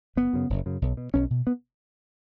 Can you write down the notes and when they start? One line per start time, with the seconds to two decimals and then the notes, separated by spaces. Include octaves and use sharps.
0.16 F#1 B3
0.33 F#2 C#3
0.50 F#1
0.66 F#2 C#3
0.82 B1
0.97 B2
1.14 B1 C#4
1.30 B2
1.47 B3